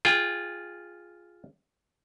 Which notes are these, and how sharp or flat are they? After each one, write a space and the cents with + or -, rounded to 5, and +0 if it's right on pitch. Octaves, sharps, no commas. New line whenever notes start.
F4 +0 G#4 +0 G5 +25